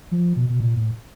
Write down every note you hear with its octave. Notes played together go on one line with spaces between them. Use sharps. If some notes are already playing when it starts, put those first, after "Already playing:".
F3
B2
B2
A#2
A2